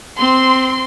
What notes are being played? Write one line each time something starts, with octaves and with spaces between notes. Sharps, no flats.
C4 C6